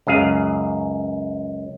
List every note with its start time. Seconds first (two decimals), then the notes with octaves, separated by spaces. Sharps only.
0.07 C#2 F#2 G#4 F5